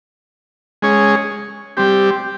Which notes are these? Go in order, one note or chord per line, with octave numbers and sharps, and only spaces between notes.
G#3 C#4 G#4 C#5
G3 C4 G4